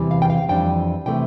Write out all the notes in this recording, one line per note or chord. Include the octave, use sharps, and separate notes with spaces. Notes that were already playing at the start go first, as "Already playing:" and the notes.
Already playing: E2 C3 E3 G3
F5
G5
F5
F2 E3 G3 D4 G5
C3 E3 A3 G5